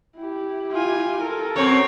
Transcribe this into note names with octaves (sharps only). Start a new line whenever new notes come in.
E4 G4
F4 G#5
A4 A#4
F#2 C4 C#5